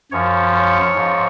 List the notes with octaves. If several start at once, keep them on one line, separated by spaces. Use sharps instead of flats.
F#2 F3 C#5
C#5
G#2 F3